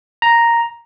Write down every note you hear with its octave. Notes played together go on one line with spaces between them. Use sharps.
A#5